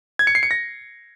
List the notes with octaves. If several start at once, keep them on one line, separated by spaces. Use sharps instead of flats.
G#6
C#7
C7
C#7
A#6